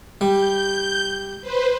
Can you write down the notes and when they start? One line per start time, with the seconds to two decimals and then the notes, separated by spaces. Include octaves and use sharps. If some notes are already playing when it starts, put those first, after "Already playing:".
0.21 G3 G6
1.41 B4 C5